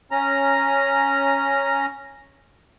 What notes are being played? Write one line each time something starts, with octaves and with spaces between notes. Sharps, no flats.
C#4 A#5